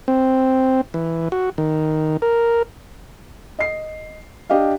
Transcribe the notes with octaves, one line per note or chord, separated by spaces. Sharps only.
C4
E3
F#4
D#3
A#4
D#5 C7
D4 G4 D#5 F5